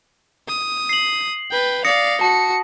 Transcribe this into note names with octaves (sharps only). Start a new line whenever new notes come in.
D#6
C7 F#7
B4 G5
D5 F5 D#6 A#6 C#7
F#4 A5 C#7